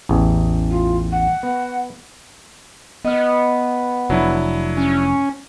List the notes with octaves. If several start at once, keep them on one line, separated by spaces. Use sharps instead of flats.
A1 E2
F4
F#5
B3
B3 D#5 F6
F1 F#3 D4 E4
C#4